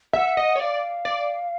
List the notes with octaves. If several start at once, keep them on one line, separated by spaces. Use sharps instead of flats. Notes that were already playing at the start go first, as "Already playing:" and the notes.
E5 F#5
D#5
C#5
D5 F5
D5